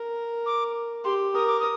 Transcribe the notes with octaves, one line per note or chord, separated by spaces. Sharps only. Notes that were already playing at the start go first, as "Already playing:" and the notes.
Already playing: A#4
D6
G4 C6
A#4 D#6
D6
D#6